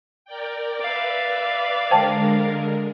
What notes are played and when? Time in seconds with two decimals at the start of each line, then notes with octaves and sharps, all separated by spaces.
0.25 A#4 D5 G5
0.80 B4 D5 E5 F5
1.91 D3 G#3 A#4 C5 G5 A5